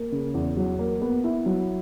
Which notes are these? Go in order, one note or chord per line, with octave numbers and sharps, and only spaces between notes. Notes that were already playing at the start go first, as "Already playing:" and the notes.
Already playing: A#3
C#3
E2
F#3
A#3
B3
E4
F#3